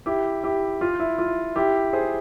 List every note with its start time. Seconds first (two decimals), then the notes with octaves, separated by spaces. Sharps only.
0.06 E4 G4
0.43 E4 G4
0.81 F4
1.00 E4
1.19 F4
1.56 E4 G4
1.93 G#4 C5